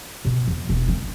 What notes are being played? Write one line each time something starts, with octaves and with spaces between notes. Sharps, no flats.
B2
E2
E1
G#3